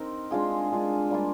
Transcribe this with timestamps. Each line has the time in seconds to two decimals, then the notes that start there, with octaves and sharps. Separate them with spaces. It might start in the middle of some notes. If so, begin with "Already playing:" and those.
Already playing: C4 D#4 A#4
0.31 G#3 D4 F4 G#4
0.71 G#3 D4 F4 G#4
1.10 G3 A#3 D4 F4